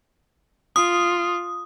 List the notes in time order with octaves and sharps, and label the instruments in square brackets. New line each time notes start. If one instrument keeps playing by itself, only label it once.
[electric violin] F4 [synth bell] D#6